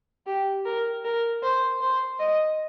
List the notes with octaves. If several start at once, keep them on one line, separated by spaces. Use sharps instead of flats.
G4
A#4
A#4
C5
C5
D#5